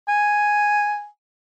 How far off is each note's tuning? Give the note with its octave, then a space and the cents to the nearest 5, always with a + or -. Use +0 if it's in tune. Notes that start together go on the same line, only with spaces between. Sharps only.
G#5 +0